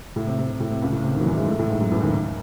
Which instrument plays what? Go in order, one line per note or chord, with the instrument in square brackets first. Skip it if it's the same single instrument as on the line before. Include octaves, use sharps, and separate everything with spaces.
[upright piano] A2
C3
C3
C3
A2
C3
C#2 C#3
A2
C3
D#2 D#3
F#3
E2 E3
G#2 G#3
A2 A3
A2 A3
G#2 G#3
F#2 F#3
E2 E3
D#2 D#3
D#2 D#3